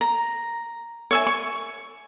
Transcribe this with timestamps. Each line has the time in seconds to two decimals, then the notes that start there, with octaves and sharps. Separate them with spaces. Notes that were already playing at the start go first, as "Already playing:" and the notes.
0.01 A#5
1.11 C#5 E5 G#5
1.27 C#6